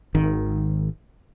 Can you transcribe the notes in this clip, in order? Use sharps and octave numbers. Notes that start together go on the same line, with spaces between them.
G#1 D#3